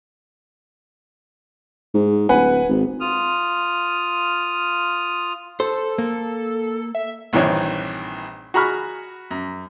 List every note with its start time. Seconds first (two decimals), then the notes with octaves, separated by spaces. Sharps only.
1.94 G#2
2.29 D1 B4 F#5 G#5
2.69 G#1
3.00 F4 D#6 F6
5.60 A4 C5
5.98 A#3
6.95 E5
7.33 A#1 G2 D#3 E3 C4 C#5
8.54 F#4 G#4 A#5 B5 C#6 F6
9.31 F#2